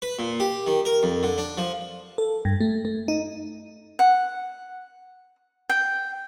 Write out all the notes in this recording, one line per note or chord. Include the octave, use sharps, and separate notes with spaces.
B4
A#2
G4
D#3
A#4
F2
D3
D4
F3
A4
G2
A3
A3
D#4
F#5
G5